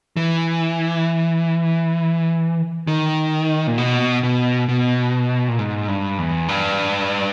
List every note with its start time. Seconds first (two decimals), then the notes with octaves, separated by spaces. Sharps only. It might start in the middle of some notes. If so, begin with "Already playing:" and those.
0.17 E3
2.87 D#3
3.67 A#2
3.78 B2
4.23 B2
4.69 B2
5.48 A#2
5.59 G#2
5.88 G2
6.18 E2
6.48 G2